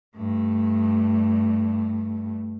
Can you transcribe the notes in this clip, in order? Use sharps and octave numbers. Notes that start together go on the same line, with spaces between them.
G2 A3